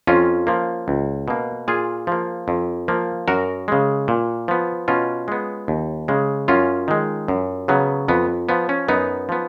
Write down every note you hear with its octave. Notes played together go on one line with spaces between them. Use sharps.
F2 C#4 F4
F3 A#3
C#2
B2 A#3
A#2 F4 G#4
F3 A#3
F2
F3 A#3
F#2 F#4 A#4
C#3 G#3
A#2
F3 B3
B2 C#4 F4
G#3 B3
D#2
C#3 G#3
F#2 C#4 F4
D#3 G#3
F#2
C#3 F#3 B3
F2 B3
F3 B3
C#4
F#2 B3 D#4
F3 B3